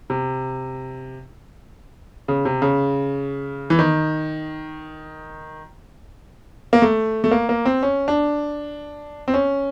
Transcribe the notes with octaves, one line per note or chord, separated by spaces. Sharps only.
C3
C#3
C3
C#3
E3
D#3
A#3
A3
A3
A#3
A#3
C4
C#4
D4
C4
C#4